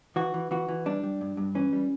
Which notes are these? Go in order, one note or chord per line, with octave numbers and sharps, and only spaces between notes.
E3 F#4
E3
E3 F#4
E3
G3 D4
G3
G2
G2
E3 C#4
G3